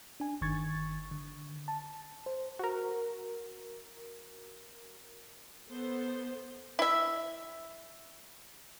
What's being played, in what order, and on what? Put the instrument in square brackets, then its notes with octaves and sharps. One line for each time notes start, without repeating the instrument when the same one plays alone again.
[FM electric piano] D4 G#5
G1 D#3 C#6 G#6 A6
D3
A5
C5
[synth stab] F#4 A#4
[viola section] B3 A4 C5
[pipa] E4 E5